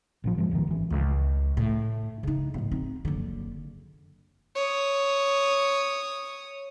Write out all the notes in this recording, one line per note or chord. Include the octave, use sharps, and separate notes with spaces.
A1 A2 F3
G2 E3 F3 G#3
D1 B1 A#2 D#3
G#1 E3
C#2
A2
C#3 D#4
D#1 A2
C4 D#4
F#1 D3
C#5 D#6